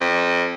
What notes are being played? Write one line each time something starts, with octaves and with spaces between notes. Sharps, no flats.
F2